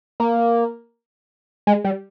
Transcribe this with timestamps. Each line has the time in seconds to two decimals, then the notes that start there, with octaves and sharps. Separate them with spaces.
0.20 A#3
1.67 G#3
1.85 G3